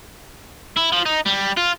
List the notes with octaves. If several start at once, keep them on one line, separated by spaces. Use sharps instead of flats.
E4
F3
D#4
G3
F4